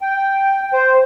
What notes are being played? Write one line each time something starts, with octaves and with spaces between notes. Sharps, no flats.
G5
C5